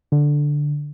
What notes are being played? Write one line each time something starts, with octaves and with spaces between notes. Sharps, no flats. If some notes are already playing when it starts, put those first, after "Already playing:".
D3